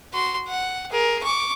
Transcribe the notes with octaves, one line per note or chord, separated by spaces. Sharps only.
F#4 C6
F#5
G#4 A#4
C#6 D6